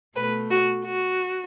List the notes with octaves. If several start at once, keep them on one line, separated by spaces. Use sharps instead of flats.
B2 A3 B4
F#4
F#4